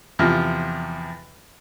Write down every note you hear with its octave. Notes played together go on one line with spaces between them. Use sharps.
E2 C3 F3 F6